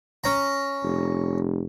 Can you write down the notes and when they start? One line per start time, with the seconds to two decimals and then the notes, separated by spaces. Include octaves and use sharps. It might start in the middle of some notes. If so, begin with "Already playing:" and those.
0.24 C#4 A#5
0.84 F1